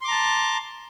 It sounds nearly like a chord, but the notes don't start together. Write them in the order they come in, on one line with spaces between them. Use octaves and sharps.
C6 D6 A#5 A5